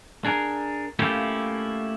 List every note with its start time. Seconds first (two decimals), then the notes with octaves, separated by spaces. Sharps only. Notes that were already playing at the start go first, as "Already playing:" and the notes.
0.25 D4 G#4 A#4
0.99 A3 A#3 C#4 E4 F4 G4